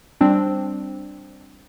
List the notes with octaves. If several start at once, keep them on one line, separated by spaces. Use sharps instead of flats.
G3 C4 D4